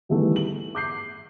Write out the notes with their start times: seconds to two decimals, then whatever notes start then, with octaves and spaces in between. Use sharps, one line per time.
0.09 D#3 E3 G3 A3 B3 A4
0.36 F#7
0.75 D6 G6 C7